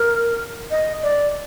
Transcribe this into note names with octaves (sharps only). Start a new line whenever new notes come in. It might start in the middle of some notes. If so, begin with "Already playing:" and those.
Already playing: A#4
D#5
D5